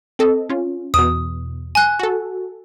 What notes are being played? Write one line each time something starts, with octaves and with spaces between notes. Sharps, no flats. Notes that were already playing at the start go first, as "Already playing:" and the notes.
C4 A4 D#5
C#4 F4
E2 B2 D#6
G#5 F#6
F#4 A4